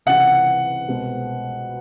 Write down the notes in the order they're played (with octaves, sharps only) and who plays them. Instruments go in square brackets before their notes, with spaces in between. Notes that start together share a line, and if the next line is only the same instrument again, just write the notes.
[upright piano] C#2 C3 E3 G3 [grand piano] F#5
[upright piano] C2 B2 G#3 C4